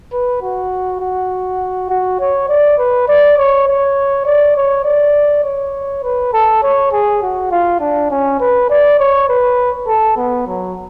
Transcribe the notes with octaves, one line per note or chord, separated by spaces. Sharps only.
B4
F#4
F#4
F#4
C#5
D5
B4
D5
C#5
C#5
D5
C#5
D5
C#5
B4
A4
C#5
G#4
F#4
F4
D4
C#4
B4
D5
C#5
B4
A4
B3
F#3